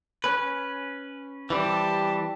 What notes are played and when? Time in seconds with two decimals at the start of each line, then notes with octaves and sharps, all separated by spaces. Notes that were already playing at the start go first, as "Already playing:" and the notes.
0.24 C#4 B4
1.50 E3 G3 C4 G4 A5